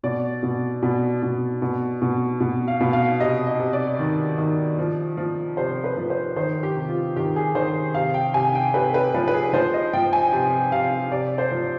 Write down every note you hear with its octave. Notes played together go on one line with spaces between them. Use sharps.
B2 D5
B2
B2
B2
B2
B2
B2
F5
B2
F5
C3 D#5
D#5
C3
D5
D#3
D#3
F3
F3
C3 C5
B4
F3
C5
D#3 C5
G4
C3
F4
D#3 G4
G#4
D#3 C5
C3 F5
G5
C3 G#5
G5
C3 B4
B4
F3 B4
B4
G#4
F3 C5
D#5
F3 G5
G#5
C3 G5
C3 F5
C3 D5
C5
F3